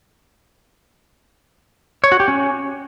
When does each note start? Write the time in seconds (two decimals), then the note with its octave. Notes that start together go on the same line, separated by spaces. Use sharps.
2.04 C#5
2.12 F#4
2.20 G4
2.28 C#4